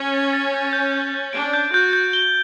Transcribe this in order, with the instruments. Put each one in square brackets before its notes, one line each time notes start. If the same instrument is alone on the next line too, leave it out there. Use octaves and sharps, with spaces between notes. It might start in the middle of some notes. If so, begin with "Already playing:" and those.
Already playing: [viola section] C#4
[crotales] A6
A6
G6
G6
G6
G6
[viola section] D4 [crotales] D7
[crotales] G6
[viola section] F#4 [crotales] G6
[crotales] G6
G7